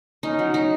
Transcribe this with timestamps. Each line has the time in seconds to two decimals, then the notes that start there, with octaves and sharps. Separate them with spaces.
0.23 C#4 D#4
0.39 F#3
0.54 F#3 D#4